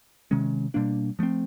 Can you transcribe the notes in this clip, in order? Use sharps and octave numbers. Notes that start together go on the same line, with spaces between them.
C3 D#3 G#3 C#4
B2 G3 A#3 D4
F3 A3 C4